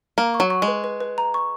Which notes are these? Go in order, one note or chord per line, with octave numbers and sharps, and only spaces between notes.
A#3 A#5
C#6
F#3
C#6
G#3
B4
B4
B4
A#5
C#6